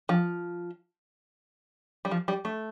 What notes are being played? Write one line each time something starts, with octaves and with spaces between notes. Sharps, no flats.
F3
G3
F3
G3
A3